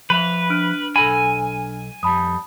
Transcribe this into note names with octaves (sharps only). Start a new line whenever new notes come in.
F3 B4 E5 F7 F#7
D4 F6 D7
B1 A4 G#5 B5
F2 G3 A5 B5 D#6